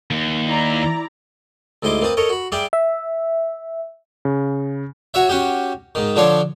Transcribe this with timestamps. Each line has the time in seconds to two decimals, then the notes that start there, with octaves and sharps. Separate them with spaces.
0.11 D#2
0.46 E4 D5 A#5
1.83 D2 G#2 E4 D#5 C6 D6
2.02 A#3 C4 B4 A5 D#6
2.17 A4 A#4 C#5 D#5
2.29 F#4 B5
2.52 G3 G4 G#4 D5 E5 G5
2.73 E5
4.25 C#3
5.14 F#4 C#5 E5
5.29 C#4 F#4 G4
5.95 G#2 D#3
6.16 D3 F3 D4 C#5 C6 D6